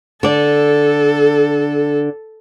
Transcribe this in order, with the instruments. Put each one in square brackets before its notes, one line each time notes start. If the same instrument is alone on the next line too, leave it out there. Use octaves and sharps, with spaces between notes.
[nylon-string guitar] D3 D5 [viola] A4